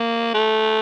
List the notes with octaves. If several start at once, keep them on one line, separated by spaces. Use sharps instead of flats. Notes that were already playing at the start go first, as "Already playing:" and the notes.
Already playing: A#3
A3